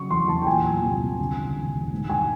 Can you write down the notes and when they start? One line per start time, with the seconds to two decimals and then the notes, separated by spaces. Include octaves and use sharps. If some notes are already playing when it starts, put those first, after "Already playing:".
Already playing: C#3 F#3 C#6
0.10 E2 C6
0.28 E2 A5
0.42 G5
0.47 A#2 G#5
0.65 F#3
0.82 C2
1.01 C2
1.18 D2
1.37 C#3
1.56 E1
1.73 E1
1.92 G#2
2.10 D#3 G#5